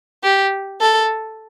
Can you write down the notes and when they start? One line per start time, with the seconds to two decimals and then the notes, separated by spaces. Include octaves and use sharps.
0.24 G4
0.81 A4